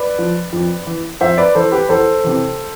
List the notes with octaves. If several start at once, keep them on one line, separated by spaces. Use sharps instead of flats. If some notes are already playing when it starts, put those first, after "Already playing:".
Already playing: B4 D5
F3
F2
E3
F2 C5 E5
B4 D5
E3 A4 C5
G4 B4
E2 A4 C5
C3 E3